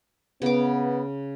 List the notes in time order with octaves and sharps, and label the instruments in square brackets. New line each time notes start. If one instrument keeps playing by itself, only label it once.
[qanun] C#3 D6 [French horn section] B3